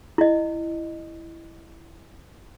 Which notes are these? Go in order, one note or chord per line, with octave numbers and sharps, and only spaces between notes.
E4 D#5